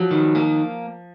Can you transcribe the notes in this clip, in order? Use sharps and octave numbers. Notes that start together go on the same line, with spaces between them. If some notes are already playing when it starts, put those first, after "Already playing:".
Already playing: F3 F#3
D#3
A#3